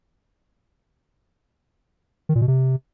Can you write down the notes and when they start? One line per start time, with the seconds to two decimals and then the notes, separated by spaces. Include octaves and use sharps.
2.29 D#3
2.35 A#2
2.42 B2
2.48 C3